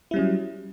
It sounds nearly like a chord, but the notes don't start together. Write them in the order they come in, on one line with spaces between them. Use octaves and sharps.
E4 G3 C#4 F#3